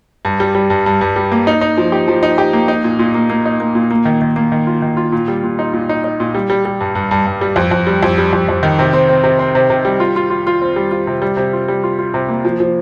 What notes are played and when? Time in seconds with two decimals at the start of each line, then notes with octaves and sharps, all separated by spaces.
0.25 G2
0.40 G3
0.55 G3
0.70 G2
0.86 G2
1.01 G2
1.16 G3
1.32 A#3
1.47 D#4
1.61 D#4
1.78 F3
1.92 G4
2.08 F3
2.23 D#4
2.38 G4
2.53 A#3
2.68 D#4
2.84 A#2
2.99 A#2
3.14 A#3
3.30 A#3
3.46 D#4
3.60 A#3
3.75 A#2
3.91 A#3
4.05 D#3
4.22 D#3
4.36 A#3
4.52 D#3
4.67 F4
4.82 D#3
4.97 F4
5.12 A#2
5.28 G3
5.44 A#2
5.59 D#4
5.73 A#2
5.89 D#4
6.04 D#4
6.20 A#2
6.35 G3
6.50 G3
6.65 G3
6.81 G2
6.95 G2
7.11 G2
7.27 G2
7.41 G3
7.56 F2
7.71 F2
7.87 G3
8.03 F2
8.18 G3
8.33 F2
8.49 F2
8.63 D#3
8.79 C3
8.93 C4
9.09 C4
9.24 C3
9.39 C4
9.55 C3
9.70 C3
9.85 G3
10.00 F4
10.16 F4
10.30 F4
10.47 F4
10.62 C4
10.76 G3
10.91 F4
11.07 C3
11.22 G3
11.37 C3
11.53 F4
11.68 G3
11.83 F4
11.99 F4
12.14 C3
12.29 A#3
12.45 F3
12.60 F3